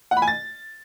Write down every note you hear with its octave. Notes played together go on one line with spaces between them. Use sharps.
F#5
B5
G#5
A6